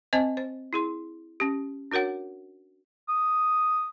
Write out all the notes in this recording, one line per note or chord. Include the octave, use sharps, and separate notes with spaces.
C4 C5 D#5 A5
C5
E4 G#4 C6
C#4 G4
D4 F#4 A#4 C#5 F#5
D#6